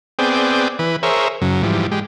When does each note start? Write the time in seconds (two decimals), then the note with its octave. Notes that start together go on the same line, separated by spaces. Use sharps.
0.19 B3 C4 G#4 D5 G5
0.79 E3 B4
1.03 G#4 A#4 C5 C#5 E5
1.42 F#2 C#3 F#3
1.63 G#2 E3 F3 G3
1.91 G#3 G4